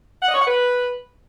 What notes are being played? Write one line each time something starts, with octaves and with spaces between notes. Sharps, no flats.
F#5
D#5
C#5
F#5
B4